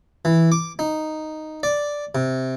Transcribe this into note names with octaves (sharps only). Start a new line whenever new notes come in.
E3
D6
D#4
D5
C3